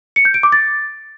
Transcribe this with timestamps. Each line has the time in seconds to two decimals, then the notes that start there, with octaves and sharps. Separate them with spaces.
0.16 C#7
0.25 G6
0.34 D7
0.43 D6
0.52 A6